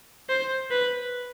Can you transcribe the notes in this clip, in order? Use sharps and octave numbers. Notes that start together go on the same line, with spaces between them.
C5
B4